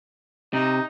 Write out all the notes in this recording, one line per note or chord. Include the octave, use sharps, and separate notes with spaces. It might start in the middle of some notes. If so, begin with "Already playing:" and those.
C3 D#4